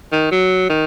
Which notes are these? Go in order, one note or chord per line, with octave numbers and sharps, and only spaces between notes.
D#3
F#3
D#3